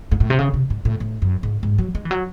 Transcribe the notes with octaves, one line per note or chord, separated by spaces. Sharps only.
G#2
A2
C3
C#3
C3
G#2
A2
A2
F#2
G#2
G#2
F#3
G#3
E3
F#3